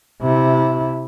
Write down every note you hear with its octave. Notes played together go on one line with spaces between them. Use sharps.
C3 E4